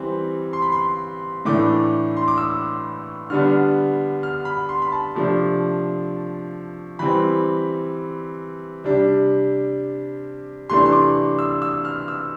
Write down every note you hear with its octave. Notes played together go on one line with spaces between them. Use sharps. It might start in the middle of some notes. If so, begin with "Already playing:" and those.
Already playing: E3 G3 C4
C6
B5
C6
A2 E3 A3 D4 D6
C6
D6
E6
D3 G3 B3 D4 F6
F6
B5
C6
B5
A5
C3 F3 A3 D4
E3 G3 C4 B5
C3 G3 D4
C3 E3 A3 D4 C6
C6
D6
E6
E6
F6
E6